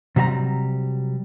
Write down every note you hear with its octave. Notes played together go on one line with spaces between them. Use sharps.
C3 F#3 G3 E5 A#5